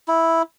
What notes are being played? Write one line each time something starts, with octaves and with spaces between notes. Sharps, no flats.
E4